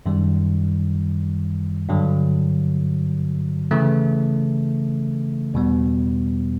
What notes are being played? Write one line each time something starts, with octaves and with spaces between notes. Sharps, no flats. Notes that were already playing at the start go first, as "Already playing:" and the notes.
F#2 D#3 G3
G2 D3 F#3
C#3 E3 A3
E2 B2 G3 B3